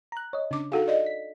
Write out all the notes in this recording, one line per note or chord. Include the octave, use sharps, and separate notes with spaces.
A#5 F#6
C#5 D#5
C#3 D4 D6
D#4 F#4 G#4 A4 F5
D5 D#5
B6